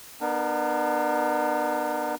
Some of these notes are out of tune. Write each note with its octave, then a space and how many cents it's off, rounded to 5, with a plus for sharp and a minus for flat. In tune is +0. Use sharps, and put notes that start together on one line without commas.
B3 -15 D4 +40 A#4 +0